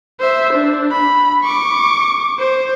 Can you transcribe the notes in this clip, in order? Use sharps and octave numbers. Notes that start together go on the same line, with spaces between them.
C5 E5
D4
B5
C#6 D6
C5